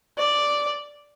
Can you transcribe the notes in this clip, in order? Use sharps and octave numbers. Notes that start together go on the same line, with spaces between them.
D5